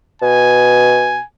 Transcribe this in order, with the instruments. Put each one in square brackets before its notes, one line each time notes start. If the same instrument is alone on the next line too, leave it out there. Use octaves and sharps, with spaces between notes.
[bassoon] B2 [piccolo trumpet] G#5